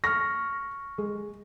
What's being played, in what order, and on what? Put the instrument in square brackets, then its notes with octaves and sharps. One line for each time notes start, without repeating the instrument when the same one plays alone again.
[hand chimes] C#6 F6 [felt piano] A#6
[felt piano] G#3